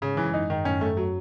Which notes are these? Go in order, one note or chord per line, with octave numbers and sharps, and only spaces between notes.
G#2 C#3
F#2 E3
G#2 D#4
D#3
F#2 A2 C#4
G#2
A3
F#2
F#3